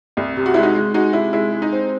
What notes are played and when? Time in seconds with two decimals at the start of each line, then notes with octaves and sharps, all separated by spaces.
0.17 C2
0.36 C3
0.46 F#4
0.54 G#3 E4
0.63 D#4 F#4
0.75 G#3
0.94 G#3 D#4 F#4
1.13 C3 E4
1.33 G#3 E4
1.53 G#3
1.62 D#4
1.72 C4